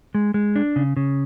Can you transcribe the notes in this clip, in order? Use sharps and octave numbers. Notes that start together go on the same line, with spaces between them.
G#3
G#3
D4
C#3
C#3